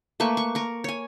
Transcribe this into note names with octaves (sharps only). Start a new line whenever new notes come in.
A3 A#3 B4 C#6
C#6
A#4 C#6
C#5 G#5